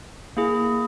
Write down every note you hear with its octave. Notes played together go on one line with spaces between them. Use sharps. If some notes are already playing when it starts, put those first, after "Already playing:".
A#3 E4 G#4